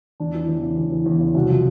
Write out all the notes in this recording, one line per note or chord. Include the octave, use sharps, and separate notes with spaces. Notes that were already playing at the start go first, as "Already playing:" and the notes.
E2 D4
E3
E2
C#3
E2
E3
E2
C#3
C2 F#4
F3